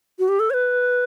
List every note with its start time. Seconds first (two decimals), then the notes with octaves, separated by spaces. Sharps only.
0.19 F#4
0.29 G4
0.39 A4
0.50 C#5
0.54 B4